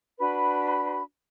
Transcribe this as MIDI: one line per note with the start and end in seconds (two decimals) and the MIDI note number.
0.19 1.01 62
0.19 1.01 66
0.19 1.01 71
0.19 1.01 83